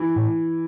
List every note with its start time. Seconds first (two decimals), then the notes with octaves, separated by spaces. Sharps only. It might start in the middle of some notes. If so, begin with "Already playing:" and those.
Already playing: E3
0.16 A2